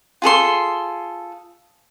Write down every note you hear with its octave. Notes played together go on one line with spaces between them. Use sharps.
F4 G#4 A4 C6